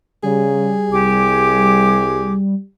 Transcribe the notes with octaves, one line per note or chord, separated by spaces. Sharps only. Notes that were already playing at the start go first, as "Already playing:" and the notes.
C#3 G3 G#4
C2 G4 D6